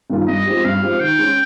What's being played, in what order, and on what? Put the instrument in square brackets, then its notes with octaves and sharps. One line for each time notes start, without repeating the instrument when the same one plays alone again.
[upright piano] G2 D#3 A#3 F4
[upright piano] G2 [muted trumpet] D#5
[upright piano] F3 G#3 C4 G4
[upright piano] G2 [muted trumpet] F5
[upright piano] F3 G#3 C4 G4
[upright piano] D#3 [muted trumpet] G5
[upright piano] G#3 C#4